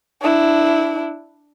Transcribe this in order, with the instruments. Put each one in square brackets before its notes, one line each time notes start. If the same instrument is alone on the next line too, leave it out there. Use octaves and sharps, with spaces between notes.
[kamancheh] D4 E4